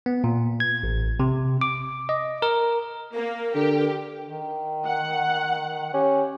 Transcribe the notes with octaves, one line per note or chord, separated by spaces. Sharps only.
B3
A#2
G#6
A1
C3
D6
D#5
A#4
A#3 A#4
D3 G4
D#3
F#5
C#4 G4